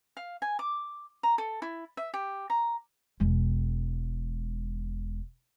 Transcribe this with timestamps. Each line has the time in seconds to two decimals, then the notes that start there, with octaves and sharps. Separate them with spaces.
0.17 F5
0.42 G#5
0.59 D6
1.23 A#5
1.38 A4
1.62 E4
1.97 E5
2.14 G4
2.50 A#5
3.20 E1 G#3